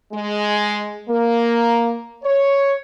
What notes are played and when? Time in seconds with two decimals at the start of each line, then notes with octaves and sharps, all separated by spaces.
0.13 G#3
1.10 A#3
2.24 C#5